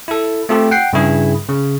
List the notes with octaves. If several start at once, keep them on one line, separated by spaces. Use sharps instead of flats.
E4 A4
A3 C4 F4 G4 A4
F#5 G5 C7
G2 C#3 E4 G#4
C#3